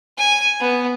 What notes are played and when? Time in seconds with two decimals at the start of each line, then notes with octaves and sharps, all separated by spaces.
0.18 G#5
0.60 B3